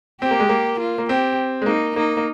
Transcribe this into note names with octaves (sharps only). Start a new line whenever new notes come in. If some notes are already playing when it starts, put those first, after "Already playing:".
C4 G4
A#3
G#3
A#3
F4
A#3
C4 G4
G#3
A#3 D#4
A#3 D#4
A#3